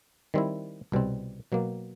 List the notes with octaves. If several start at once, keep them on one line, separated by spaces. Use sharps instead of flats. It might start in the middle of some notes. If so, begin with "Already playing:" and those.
D#3 G3 C4 E4
C2 B2 G3 C4
B2 F#3 A#3